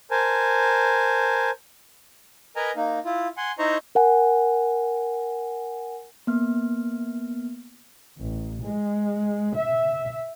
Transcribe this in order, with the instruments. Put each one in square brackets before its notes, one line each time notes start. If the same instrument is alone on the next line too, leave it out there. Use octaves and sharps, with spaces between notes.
[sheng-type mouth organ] A#4 C5 G#5 A5
A#4 B4 D#5 G#5 A#5
A#3 D#4
E4 F4
F#5 G#5 C6
D#4 E4 C5 D#5 A#5 C#6
[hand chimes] A#4 F#5 G#5
A#3 B3 F6
[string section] A1
G#3
E5